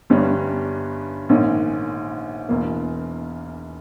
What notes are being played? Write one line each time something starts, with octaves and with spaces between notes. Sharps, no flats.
G1 G2 G3 C#4
A#1 G#2 D#3 A#3 C#4
E1 E2 B2 A#3